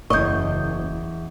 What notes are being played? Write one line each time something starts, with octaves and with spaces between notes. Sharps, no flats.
F#1 E2 D#5 C#6 G6